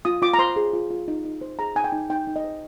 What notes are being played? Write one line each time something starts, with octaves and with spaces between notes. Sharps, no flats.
F4 D#6
F4 D6
A#5
C5 C6
G#4
F4
F4
D#4
D#4
C5
G#4 A#5
D#4 G#5
G5
D#4
D#4 G5
D#4
D#5
C5